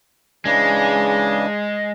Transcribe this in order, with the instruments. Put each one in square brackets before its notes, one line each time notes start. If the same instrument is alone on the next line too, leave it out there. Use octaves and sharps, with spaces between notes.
[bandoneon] C#3 E3 D4 [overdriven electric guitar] G#3